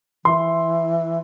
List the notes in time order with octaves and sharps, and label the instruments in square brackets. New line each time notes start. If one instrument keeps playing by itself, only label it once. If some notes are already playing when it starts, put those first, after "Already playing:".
[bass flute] E3 [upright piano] C6